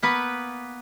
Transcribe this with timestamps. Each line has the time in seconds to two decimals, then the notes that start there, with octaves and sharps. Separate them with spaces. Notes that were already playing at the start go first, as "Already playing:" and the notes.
0.02 A#3 B3 B4